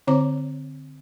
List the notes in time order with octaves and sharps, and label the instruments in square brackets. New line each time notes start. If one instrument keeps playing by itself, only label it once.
[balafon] D3 C4 C5 C#5 A#5 D6